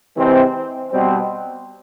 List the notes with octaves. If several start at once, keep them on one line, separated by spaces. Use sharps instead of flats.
C3 E3 G#3 C4
B2 G3 C4